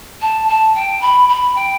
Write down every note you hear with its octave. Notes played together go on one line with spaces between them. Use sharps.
A5
A5
G5
B5
B5
G5